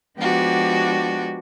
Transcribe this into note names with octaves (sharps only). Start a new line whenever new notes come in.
F3 G#3 B3 D4 F#4 G4